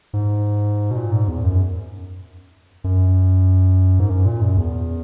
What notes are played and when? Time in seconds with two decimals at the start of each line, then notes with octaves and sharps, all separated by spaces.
0.13 G#2
0.91 B2
0.97 A#2
1.12 G#2
1.28 E2
1.44 F#2
2.84 F#2
3.99 G#2
4.10 F#2
4.26 A#2
4.42 F#2
4.57 E2